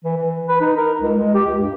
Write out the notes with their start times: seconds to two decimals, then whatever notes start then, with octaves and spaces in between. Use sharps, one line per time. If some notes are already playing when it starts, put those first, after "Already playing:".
0.05 E3
0.17 E3
0.48 B4
0.61 D#4
0.77 A#4
1.02 C#2
1.16 G#3
1.35 G4
1.47 C#2
1.61 G2